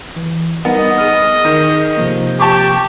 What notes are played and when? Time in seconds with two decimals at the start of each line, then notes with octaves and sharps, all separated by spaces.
0.16 E3
0.65 G3 B3 D#4 A#4 D#5
0.98 G#4 F6
1.45 D#3
1.97 C3 F3 A#3
2.40 G4 A5 C#6 D6